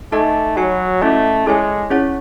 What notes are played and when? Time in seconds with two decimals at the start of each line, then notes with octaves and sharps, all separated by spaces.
0.12 A3 D#4 A4 D#5 A5
0.56 F#3 F#4 C#5 G#5
1.01 A3 C#4 E4 A4 D#5
1.46 G#3 E4 A4 C#5 G#5
1.90 C#4 E4 G#4 C#5 F#5